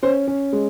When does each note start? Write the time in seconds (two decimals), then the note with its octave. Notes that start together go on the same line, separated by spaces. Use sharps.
0.03 C#4 C5
0.28 C#4
0.53 G#3